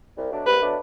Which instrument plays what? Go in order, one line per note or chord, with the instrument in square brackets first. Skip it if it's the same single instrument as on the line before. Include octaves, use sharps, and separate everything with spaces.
[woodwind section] C2
B2 F#3 A3 D4
[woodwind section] C2 [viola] B4
[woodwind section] B2 F#3 A3 D4